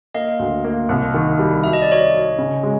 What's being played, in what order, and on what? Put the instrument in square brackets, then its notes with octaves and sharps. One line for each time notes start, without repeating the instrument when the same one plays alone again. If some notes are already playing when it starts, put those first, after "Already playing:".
[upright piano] A#3 [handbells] D#5 F5
[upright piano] D2
A#3
C2
D#3
G3
[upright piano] F#3 [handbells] E5
[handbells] D#5
D5
[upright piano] F#3 [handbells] C#5 D#5
[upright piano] F#3
C#3
G#3